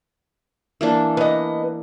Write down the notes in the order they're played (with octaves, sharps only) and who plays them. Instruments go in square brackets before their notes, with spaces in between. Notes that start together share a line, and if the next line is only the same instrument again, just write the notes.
[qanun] E3 A#3 D4
[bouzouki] B3 D#5